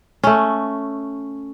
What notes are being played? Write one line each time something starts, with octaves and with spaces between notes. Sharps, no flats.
A3 C#4